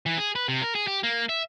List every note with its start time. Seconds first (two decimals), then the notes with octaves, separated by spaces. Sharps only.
0.06 E3
0.18 G#4
0.35 B4
0.48 C3
0.62 A#4
0.75 G#4
0.87 G4
1.03 A#3
1.29 E5